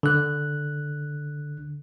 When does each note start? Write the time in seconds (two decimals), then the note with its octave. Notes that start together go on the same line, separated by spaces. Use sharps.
0.03 D3 F#6